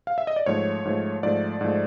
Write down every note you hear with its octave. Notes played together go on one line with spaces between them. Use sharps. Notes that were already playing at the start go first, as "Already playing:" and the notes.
F5
E5
D#5
D5
G#2 F3 A3 C#5
G#2 F3 A3
G#2 F3 A3 D5
G#2 F3 A3